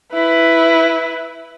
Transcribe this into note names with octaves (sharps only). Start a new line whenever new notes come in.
E4 B4